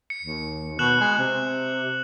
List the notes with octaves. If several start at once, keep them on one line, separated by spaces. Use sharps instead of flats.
C#7
D#2
B2 F#6 E7 F#7
G#3
C3